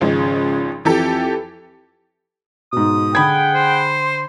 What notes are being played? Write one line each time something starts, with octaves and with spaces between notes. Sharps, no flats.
G#1 C#3 F3 G#3
F2 E3 G4 A4
G#2 B2 D#6
D3 G#4 F#5 G5 B5 G#6
C5